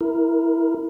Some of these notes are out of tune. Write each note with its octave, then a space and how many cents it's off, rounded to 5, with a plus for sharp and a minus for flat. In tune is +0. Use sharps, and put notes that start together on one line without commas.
E4 +0 A#4 +0